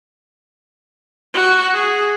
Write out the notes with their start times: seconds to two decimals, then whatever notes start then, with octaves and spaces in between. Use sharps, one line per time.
1.34 F#4
1.74 G#4